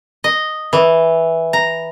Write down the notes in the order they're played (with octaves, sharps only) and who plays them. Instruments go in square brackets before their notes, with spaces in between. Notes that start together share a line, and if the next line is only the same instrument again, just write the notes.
[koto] D#5
E3
A#5